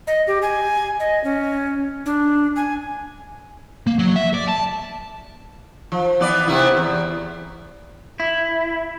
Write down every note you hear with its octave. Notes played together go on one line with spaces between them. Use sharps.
D#5
G4
G#5
D#5
C#4
D4
G#5
A#3
F#3
E5
D5
A5
F3
E3 B3 D5
C3 B3 E4
E2
E4